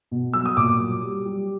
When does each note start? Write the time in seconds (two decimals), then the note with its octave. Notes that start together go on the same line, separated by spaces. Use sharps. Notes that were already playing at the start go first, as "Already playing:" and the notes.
0.11 B2
0.33 F#3 E6
0.46 D#6
0.57 A#2 D6
0.80 F#3
1.02 G3
1.25 G3